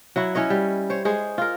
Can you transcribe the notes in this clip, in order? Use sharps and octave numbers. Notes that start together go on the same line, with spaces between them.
F#3 E4 F#4
C#4 E4 C#5 D#5
G3
C5 C#5
G#3 G#4 C5 C#5
F4 A#4